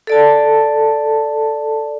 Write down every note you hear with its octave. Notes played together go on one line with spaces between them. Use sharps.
A4 D5 A5